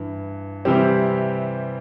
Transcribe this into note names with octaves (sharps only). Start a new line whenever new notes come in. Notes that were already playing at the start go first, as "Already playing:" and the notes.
Already playing: G2 E3
C3 E3 G3 C4 G4